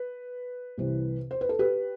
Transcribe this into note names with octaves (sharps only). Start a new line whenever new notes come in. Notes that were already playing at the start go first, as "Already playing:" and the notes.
Already playing: B4
C2 C3 E3
C5
B4
A4
G4 B4